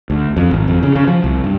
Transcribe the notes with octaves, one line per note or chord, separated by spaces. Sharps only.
D2
F2
G#1
F2
C#3
C#3
F3
C2
G2